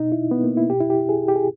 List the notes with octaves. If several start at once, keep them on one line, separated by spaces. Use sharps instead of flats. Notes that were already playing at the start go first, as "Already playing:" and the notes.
Already playing: B2 D#4
E4
B3
A#3
E4
B2 G4
E4
G4
G#4
G4
G#4